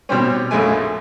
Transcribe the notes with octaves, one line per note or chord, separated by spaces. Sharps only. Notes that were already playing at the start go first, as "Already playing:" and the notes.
B2 G3 C4 C#4
A#1 F#2 G#3 A3 G#5